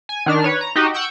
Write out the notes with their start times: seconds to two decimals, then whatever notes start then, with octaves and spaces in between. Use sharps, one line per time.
0.09 G#5
0.26 D#3 D4 F6
0.44 B4 C#5
0.61 A#5
0.76 D#4 F#4 G4 D#5
0.94 F#5 C#6 E6 G6 D7